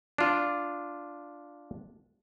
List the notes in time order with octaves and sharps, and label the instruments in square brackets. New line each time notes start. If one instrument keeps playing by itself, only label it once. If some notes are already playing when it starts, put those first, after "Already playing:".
[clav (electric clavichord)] D4 F4